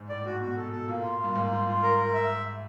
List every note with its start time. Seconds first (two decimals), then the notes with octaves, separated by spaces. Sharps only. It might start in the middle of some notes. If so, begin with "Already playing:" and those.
Already playing: G#2
0.09 A2 D5
0.25 G#2 F#4
0.41 B2 F#4
0.56 A4
0.64 B2
0.72 A4
0.88 A#2 A#3
1.03 F4
1.20 G2 A#3
1.35 G#2 A#3
1.51 F4
1.67 F4
1.83 A#4
1.98 A#4
2.14 E5